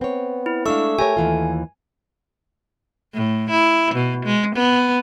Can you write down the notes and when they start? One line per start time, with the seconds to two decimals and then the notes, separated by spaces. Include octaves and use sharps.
0.01 B3 C4 C#5
0.46 E4
0.66 G#3 A3 D4 F5 C#6 E6
0.99 G4 A#4 C#5 G#5
1.17 D#2 E3 F4
3.14 A2
3.50 E4
3.95 B2
4.26 G#3
4.55 B3